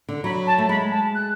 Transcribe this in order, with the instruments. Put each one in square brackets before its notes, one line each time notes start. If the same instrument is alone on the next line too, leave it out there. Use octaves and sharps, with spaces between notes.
[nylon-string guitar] D3
[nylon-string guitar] F#3 [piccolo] B5
[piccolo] A5
[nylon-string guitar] A3
[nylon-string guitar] G#3 [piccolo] B5
[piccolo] A5
F#6